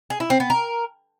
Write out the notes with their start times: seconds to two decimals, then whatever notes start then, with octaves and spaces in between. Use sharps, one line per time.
0.10 G#4
0.20 E4
0.30 C4
0.40 B3
0.50 A#4